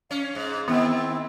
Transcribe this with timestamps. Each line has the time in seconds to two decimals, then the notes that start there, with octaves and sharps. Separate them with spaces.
0.11 C#4 F5
0.35 G#2
0.68 D#3 B3 C4 E4